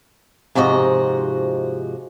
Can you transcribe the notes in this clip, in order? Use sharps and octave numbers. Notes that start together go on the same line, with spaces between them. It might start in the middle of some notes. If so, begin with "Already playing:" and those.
G#2 C3 F3 F#4 D#5